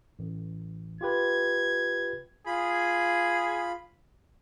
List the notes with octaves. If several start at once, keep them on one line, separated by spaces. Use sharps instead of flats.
A1
F4 G4 B4 G#6
F4 G#4 B5